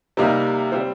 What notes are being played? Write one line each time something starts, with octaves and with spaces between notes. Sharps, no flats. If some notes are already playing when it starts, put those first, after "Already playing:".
C3 G3 A#3 D#4
G3 C4